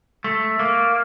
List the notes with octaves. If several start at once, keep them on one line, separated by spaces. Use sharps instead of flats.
A3
A#3